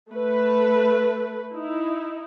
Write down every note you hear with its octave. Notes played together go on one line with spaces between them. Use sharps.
A3 B4
D#4 E4